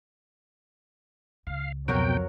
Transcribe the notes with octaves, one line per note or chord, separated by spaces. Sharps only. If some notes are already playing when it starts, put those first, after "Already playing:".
C#2 F5
F2 B2 F#3 F#4 A#4 G5